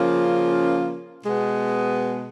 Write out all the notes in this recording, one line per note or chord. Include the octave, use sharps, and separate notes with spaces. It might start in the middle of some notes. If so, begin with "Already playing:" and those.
Already playing: C#3 F3 A#3 C#4 F4
B2 G#3 B3